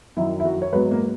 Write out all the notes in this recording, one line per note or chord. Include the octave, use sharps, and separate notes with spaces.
F#2 D#3 F#3 E4
E4
F#3 F#4
C#5
G#2 F#3 B3 B4
A#3 A#4